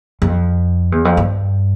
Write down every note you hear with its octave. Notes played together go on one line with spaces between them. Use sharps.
F2
E2
F2
G2